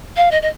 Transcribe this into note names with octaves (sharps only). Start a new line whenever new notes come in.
F5
D#5
D#5